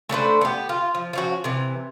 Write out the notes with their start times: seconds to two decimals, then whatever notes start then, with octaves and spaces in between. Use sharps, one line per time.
0.09 A3 D4 B4 C5
0.41 B3 G4
0.69 F4
0.95 F3
1.13 F3 C#4 F#4
1.44 C3 E3